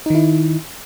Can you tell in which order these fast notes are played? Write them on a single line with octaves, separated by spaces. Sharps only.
D#4 D#3 E4